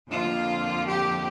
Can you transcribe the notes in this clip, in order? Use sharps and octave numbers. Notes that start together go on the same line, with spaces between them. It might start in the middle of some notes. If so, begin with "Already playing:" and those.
F2 D3 F3 A#3 F4
G4